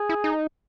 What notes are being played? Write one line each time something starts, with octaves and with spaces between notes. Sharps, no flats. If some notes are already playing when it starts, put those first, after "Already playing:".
Already playing: G#4
E4
D#4